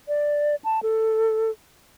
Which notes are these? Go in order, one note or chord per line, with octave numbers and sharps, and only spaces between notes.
D5
A5
A4